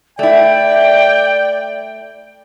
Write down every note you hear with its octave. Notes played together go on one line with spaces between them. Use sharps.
A3 E4 D5 G5